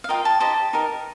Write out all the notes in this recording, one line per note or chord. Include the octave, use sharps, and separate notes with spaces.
F5
F4 A#4 D#5 G5
A5
D#4 G4 C5 D#5 A5
D#4 G4 A#4